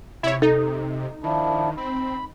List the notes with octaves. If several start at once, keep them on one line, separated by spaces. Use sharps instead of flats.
C3 E4 C#5
D#4 A4
D#3 F3 D4 E4
C4 B5